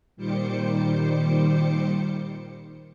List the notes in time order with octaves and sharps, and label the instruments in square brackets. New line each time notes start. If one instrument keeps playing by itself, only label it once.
[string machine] A#2 D#3 G3 C5 D6 C#7